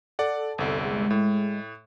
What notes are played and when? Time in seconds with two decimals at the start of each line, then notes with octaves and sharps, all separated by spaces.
0.19 A4 D5 F#5
0.58 G1 C2
0.84 G#3
1.10 A2